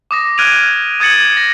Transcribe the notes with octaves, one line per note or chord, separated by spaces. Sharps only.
D6 D#6 A#6
F6 F#6 G#6 D7 D#7 F7
D#6 G#6 A6 C#7 F#7
A#6